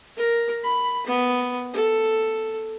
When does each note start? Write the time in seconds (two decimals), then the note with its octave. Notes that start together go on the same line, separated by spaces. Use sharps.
0.17 A#4
0.63 B5
1.07 B3
1.73 A4